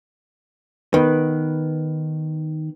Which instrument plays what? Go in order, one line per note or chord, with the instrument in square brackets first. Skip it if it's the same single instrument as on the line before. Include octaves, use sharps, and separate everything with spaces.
[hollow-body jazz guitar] D#3 [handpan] B3 B4